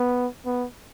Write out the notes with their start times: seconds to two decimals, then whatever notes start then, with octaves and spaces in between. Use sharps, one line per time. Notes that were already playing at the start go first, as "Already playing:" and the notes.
Already playing: B3
0.45 B3